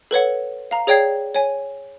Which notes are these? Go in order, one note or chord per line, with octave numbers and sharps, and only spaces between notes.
A4 B4 C#5 F#5
F5 A#5
G#4 C#5 D5 G5 G#6 C7
C#5 G#5